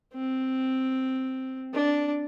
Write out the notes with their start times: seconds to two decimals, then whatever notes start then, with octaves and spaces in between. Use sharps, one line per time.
0.14 C4
1.74 D4